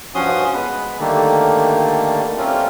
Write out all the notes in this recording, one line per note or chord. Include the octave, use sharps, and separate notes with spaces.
G2 F3 C#4 F#4 C6 D#6
G#3 B3 B4
D3 D#3 G3 A3 A#3
G3 A3 A#3 C4 C#4 F4